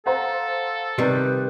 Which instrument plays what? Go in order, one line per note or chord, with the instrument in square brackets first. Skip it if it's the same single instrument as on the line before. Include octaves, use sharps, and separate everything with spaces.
[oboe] A4 [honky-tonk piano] C5 F#5 A#5 [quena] F5
[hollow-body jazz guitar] C3 D#3 G3 [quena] B4